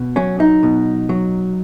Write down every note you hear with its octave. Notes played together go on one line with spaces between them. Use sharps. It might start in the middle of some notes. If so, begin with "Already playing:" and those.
Already playing: B2
F#3 C#4
D#4
B2
F#3